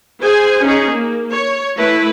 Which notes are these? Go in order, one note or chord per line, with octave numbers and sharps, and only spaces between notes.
G#4 C5 G#5
C#4 D#4 G#4
A#3
C#5
A3 E4 B4